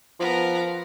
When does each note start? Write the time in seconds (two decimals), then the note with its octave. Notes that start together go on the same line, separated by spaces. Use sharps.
0.20 F3 B3 A#4